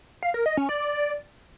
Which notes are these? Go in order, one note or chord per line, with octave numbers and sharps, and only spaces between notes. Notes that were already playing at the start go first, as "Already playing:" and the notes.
F5
A#4
D#5
C#4
D5